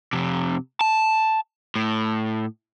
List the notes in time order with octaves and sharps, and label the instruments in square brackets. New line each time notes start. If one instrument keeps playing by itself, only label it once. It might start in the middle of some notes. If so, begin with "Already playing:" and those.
[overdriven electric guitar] F2 C3
A5
A2